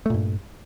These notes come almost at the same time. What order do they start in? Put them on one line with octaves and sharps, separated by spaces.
A3 A#2 G2